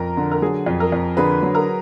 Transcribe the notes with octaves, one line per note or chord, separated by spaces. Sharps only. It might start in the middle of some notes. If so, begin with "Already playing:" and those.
Already playing: F2 A#4
D3
A#4
F#3 G#4
F2
A#4
F2
D3 G#4 B4
F#3
A#4